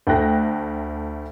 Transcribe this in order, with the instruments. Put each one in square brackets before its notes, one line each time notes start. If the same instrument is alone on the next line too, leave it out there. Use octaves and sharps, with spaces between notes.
[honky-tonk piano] D2 A3 G5 F#6 A#6